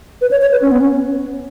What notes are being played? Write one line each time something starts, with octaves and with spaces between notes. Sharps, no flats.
B4
C#5
C#5
B4
C#4
B3
C#4